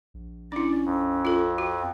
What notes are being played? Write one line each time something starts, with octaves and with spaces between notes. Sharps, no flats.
A#1
C#4 D4 E4 D5
F2
F4 A4
F#4 G5